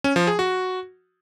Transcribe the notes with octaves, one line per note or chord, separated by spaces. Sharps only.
C#4
F3
G#4
F#4